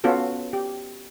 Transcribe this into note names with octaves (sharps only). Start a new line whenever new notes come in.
B3 C#4 F4 F#4 A4
G4